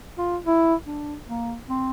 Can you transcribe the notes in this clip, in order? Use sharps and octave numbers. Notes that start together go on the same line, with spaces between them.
F4
E4
D4
A#3
C4